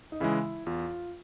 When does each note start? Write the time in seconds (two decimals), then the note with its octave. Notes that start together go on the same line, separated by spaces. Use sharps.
0.12 D#4
0.20 C#3 E3 G#3 E4
0.66 E2 F4